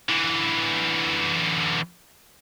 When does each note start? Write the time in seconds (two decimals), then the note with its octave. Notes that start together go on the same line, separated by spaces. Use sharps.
0.09 D3 E3